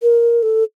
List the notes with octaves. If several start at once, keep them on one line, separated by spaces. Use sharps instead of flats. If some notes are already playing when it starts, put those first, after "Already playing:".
A#4
A4